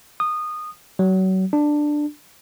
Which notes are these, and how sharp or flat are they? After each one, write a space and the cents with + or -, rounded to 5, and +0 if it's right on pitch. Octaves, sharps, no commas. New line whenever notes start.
D#6 -20
F#3 +30
D4 +10